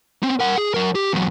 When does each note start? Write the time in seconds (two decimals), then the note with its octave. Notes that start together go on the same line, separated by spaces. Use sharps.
0.23 C4 C#4
0.40 A#4 F#5
0.58 G#4
0.74 F#3 A#4
0.95 G4
1.13 E2 F#3